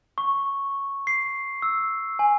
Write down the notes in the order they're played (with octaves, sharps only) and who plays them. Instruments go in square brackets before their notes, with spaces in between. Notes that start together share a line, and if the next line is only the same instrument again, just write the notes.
[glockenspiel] C#6
C7
E6
G#5